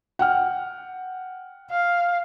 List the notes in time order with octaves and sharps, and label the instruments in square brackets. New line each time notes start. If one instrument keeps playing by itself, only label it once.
[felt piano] F#5 G5 F6
[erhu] F5